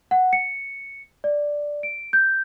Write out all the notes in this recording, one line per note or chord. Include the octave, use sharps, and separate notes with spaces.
F#5
C#7
D5
D7
G6